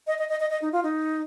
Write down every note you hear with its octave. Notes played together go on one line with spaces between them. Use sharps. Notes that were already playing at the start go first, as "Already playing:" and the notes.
D#5
D#5
D#5
D#5
D#5
D#4
F4
D#4